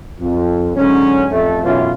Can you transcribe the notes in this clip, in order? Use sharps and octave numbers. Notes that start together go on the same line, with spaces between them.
F2
G#2 D3 F#3 C#4
A1 F2 A3
B1 F#2 E3 C#4 F4